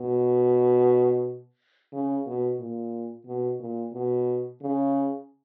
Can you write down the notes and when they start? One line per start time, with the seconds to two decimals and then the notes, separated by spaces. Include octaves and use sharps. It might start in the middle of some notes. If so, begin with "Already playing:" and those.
Already playing: B2
1.92 C#3
2.26 B2
2.59 A#2
3.26 B2
3.59 A#2
3.93 B2
4.61 C#3